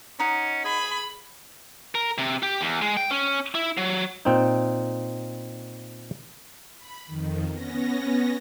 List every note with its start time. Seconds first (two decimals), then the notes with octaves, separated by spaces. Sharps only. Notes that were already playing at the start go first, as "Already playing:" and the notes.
0.20 C#4 D#4 F#5
0.65 G#4 B5
1.95 A#4
2.18 C3
2.43 G4
2.61 E2
2.82 G#3
2.97 G5
3.11 C#4
3.55 E4
3.77 F#3
4.25 A#2 C4 D#4
6.76 B5
7.07 F2 D#3
7.52 B3 C#4 A#6